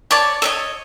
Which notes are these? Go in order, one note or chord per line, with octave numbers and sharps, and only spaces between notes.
C#5 D5 A5
A4 C#5 D#5